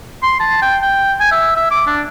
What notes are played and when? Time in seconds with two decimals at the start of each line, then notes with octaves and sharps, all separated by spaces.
0.23 C6
0.40 A5
0.62 G5
0.82 G5
1.20 G#5
1.32 E5
1.56 E5
1.71 D6
1.87 D4